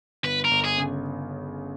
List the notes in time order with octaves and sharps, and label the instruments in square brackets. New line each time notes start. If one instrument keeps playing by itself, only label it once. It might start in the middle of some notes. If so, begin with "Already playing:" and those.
[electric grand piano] G1 [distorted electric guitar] B4
[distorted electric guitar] A#4
[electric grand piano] G1
[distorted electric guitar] G#4
[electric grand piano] C#3